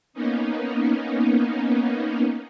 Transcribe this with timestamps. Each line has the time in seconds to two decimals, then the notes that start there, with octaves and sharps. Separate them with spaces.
0.14 A#3 B3 C#4 D#4